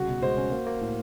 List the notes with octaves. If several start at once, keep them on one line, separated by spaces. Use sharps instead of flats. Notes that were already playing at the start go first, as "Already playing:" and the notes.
Already playing: C2 C#3 F#4
B2
G#3 C5
C#4
A#3
A#3
A2